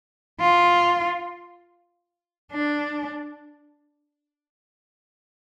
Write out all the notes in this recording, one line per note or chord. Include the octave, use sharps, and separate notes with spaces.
F4
D4